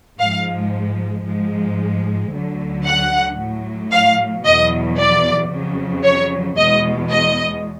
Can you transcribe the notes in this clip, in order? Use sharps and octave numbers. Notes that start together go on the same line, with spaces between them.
G#2 F3 G#3 F5
G#2 F3 G#3
D2 D3 F#3
F#5
A2 F#3
F5
E2 B2 F#3 D#5
D5
F2 C#3 F#3
C#5
E2 B2 G#3 D#5
D#5